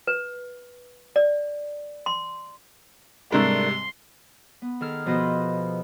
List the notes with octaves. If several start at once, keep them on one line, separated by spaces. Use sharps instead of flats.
B4
D5
C6
G#2 C3 G3 A3 D4 A#4 C6
B3
D#3 G#4 A4 F6
B2 F3 B3 B4 C5 D#5